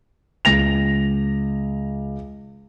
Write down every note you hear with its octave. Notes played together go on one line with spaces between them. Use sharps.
C#2 A#6 F7